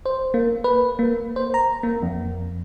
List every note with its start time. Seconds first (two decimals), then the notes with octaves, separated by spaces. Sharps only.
0.05 C5
0.34 A#3
0.64 B4
0.99 A#3
1.36 C5
1.54 A#5
1.83 A#3
2.02 F2